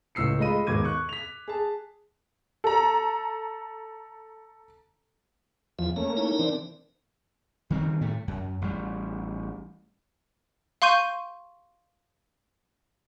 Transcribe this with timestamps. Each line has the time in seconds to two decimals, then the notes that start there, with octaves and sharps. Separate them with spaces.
0.15 C#2 A2 E6 C7 C#7
0.39 G#3 A3 F4 D#5 B5 D#7
0.67 D#2 G#2 B2 D6 G#6 D#7
0.85 C#6 F#6
1.09 B6 F7
1.48 G#4 A5
2.64 A4 A#5
5.79 E2 F3 E5
5.96 A3 A#3 C#4 A#5
6.17 D#4 E4 A#4
6.39 E3 C4 D4
7.70 D#3 G3 C4
8.01 A2 A3
8.28 F#2
8.62 A1 G3
10.82 F5 C6 C#6 G6 D#7